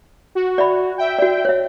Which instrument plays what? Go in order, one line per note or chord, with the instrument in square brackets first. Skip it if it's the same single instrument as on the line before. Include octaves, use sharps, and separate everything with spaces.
[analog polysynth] F#4
[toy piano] D5 E5 B5
[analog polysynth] E5 G5
[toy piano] F#4 D5
C#5 E5